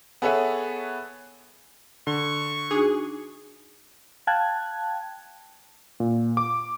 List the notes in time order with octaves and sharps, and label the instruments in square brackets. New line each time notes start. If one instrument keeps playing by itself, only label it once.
[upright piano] B3 G#4 A4 C#5 E5 F#5
[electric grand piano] D3 [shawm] C#6
[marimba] D4 D#4 F#4 [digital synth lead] G#4
[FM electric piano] F5 G5 A5 F#6 G#6
[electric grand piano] A#2
D6